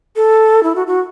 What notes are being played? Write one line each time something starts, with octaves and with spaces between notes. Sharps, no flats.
A4
E4
F#4
F#4